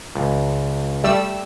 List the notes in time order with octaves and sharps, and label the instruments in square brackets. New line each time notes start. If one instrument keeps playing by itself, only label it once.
[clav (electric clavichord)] C#2
[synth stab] G3 A3 E6